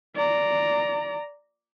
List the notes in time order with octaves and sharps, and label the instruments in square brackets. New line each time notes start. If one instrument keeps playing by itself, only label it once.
[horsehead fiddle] D5 A#5